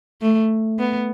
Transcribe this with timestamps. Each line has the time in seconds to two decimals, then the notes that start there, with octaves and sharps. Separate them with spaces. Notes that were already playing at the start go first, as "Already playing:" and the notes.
0.21 A3
0.79 B3